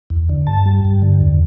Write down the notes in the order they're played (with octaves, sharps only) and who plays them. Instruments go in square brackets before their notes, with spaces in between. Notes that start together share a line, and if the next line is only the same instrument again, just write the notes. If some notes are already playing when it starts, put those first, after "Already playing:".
[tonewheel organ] E2
D3
G2 A5
G3
G2
D3
E2